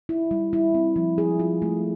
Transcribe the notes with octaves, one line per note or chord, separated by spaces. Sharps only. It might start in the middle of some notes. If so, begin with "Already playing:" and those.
E4
G3
E4
C4
F3
G#4
F4
A3